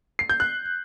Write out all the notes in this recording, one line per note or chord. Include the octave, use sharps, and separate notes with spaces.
C7
G6
F#6